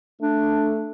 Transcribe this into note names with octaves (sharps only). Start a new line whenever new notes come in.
A3 D4